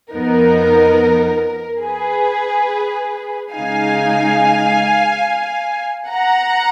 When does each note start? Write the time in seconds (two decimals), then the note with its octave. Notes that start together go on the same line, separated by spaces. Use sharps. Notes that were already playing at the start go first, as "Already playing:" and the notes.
0.12 F2 F3 B3 D#4 A#4
1.83 G#4 B4
3.53 C#3 G#3 D#4 F5 G#5
6.09 F#5 A#5